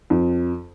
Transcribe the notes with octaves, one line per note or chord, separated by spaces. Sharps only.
F2